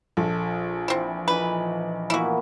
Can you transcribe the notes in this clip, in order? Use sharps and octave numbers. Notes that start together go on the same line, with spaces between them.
A#1 A4
E3 C4 E4
E3 D#4 B4 A5
E3 A#3 B3 E4 F#4